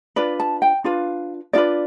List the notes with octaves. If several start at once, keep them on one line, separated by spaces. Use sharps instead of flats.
D4 F4 B4 D5
A5
G5
D4 F4 B4 F5
D4 F4 B4 D5